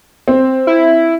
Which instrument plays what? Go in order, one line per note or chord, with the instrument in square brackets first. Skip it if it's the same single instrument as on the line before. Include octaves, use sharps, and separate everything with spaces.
[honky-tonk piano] C4
[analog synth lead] E4